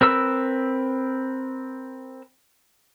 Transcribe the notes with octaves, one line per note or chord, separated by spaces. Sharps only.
C4 A#4 B4 E6